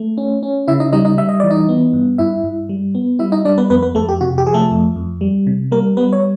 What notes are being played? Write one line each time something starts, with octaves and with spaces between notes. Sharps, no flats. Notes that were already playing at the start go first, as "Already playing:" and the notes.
Already playing: A3
C#4
C#4
C#3 E4 E5
D#4 D#5
G3 D#4 D#5
D#4 D#5
G3 E5
D#5
E3 D5
D#4 D#5
B3
G2
G2 E4 E5
G2
G3
B3
G3 E4 E5
D#4 D#5
G3 D4 D5
B3 B4
F2 B3 B4
B3 B4
F2 A3 A4
G4
C3 F#4
G4
F3 G#4
A3 A4
F2
F2
G3
C3
G3 A#3 A#4
G3 B3 B4
C#5